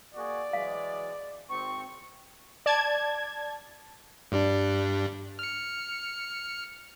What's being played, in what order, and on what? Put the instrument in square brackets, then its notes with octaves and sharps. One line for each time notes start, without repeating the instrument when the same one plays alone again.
[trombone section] A#3 F#4 G#4 [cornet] D5
[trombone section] E3 F#3 G#3 [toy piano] F5
[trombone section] G#1 C4 [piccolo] C#6
[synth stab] D5 A5 G#6
[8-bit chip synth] G2 G3 D4
F6 C#7